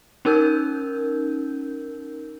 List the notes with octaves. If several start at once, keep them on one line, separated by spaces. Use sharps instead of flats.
C#4 D#4 A#4 E6 G6